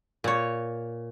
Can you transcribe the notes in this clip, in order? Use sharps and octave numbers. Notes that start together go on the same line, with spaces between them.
A#2 C#5